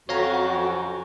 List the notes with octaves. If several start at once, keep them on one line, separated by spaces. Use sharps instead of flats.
F2 F#3 C#4 F#4 C#5 F5 A#5